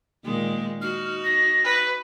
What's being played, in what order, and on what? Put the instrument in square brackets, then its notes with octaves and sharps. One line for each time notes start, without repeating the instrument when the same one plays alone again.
[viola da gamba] A#2 D#3 G#3
[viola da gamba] D#4 F#4 [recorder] F6
[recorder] A#6
[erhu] B4